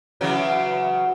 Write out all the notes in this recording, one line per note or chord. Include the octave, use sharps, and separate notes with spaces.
C#3 E3 F#3